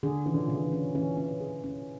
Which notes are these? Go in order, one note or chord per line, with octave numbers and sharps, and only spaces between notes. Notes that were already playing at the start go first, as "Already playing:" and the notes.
D3 G#4
E3 C#4
D3
C#3 G#4
D3
E3
C#4
E3 C#4
C#4
G#4
C#4